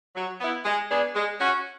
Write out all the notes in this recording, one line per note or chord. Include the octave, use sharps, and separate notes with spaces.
F#3
B3 E4
G#3
B3 D4 G#4
G#3
C#4 F#4